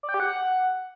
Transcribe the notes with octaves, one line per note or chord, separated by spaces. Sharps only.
D5
G5
G4
F#5